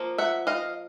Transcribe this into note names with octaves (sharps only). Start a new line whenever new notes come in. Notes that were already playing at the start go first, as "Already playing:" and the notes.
Already playing: F3 A#3
E5 F#5
D#5 F5